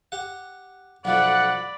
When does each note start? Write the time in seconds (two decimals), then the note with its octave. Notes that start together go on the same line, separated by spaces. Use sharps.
0.12 G4 F#5
1.05 B1 F3 A3 D5 F#5 B5